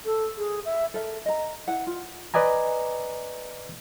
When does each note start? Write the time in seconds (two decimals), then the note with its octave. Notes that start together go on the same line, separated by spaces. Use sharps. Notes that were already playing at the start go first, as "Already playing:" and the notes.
0.05 A4
0.38 G#4
0.65 E5
0.94 A4 A#4 E5
1.26 D#5 A#5
1.68 E4 B4 F#5
1.87 F4
2.34 B4 D5 D#5 G#5 A#5